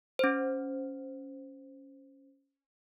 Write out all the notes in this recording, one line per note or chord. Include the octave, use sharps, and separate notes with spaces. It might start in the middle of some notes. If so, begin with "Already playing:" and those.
C#4 C5